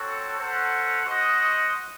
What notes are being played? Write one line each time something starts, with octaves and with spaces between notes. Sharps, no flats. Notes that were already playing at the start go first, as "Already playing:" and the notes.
Already playing: C4 F#4 A4 C#5 F#5
C#4 A4 C5 F#5
F#4 C5 D#5 F#5